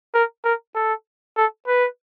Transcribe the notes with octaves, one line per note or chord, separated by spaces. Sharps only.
A#4
A#4
A4
A4
B4